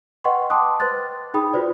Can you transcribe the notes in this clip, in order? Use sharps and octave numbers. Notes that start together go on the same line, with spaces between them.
B4 D#5 F#5 G5 C6 C#6
G5 A5 C6 D6 D#6 F#6
B4 C5 C6 F#6 A6
D#4 G#4 G5 B5 D#6
F4 F#4 B4 C5 D5